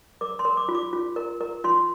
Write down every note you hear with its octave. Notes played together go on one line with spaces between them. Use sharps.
A#4 D6
C6
A#4
D6
F4
D6
F4
A#4
A#4
F4 C6